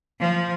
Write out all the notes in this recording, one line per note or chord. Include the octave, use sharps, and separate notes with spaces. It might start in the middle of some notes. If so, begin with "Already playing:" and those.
F3